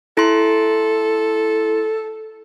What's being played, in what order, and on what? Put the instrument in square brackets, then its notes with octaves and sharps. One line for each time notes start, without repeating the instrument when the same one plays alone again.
[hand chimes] E4 C6 [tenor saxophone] A4